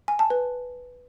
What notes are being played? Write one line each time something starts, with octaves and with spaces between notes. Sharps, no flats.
G#5
A5
B4